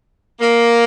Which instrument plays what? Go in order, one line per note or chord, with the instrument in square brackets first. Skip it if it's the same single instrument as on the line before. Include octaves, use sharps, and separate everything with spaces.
[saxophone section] A#3